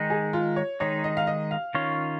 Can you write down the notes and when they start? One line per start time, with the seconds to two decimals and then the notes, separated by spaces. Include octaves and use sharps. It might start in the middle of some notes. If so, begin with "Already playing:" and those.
Already playing: D#3 G#3 D#4
0.10 G#4
0.33 F4
0.56 C#5
0.80 D#3 G#3 D#4 C#5
1.04 D#5
1.17 F5
1.27 D#5
1.51 F5
1.75 D#3 C#4 F4 C#5